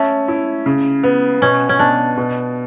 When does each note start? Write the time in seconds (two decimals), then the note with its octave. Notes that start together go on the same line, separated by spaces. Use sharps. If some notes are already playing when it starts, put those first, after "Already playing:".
Already playing: A3 C#4
0.28 E4
0.66 C#3
1.03 B3
1.41 B2 C#4
1.69 C#4
1.79 B2 D4
2.17 B2